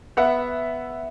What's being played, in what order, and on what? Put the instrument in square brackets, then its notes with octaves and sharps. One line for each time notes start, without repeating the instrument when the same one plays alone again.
[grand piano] B3 E5 F#5